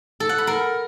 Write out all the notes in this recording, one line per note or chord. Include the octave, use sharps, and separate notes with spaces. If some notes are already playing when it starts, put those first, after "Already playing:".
A4
F#5
B5
A#4